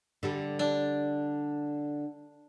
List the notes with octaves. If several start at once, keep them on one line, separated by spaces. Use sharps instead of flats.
D3 G3 A4
D4